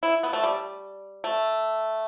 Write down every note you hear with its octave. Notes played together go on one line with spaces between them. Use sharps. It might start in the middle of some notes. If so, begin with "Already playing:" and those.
E4
B3
A3
G3
A3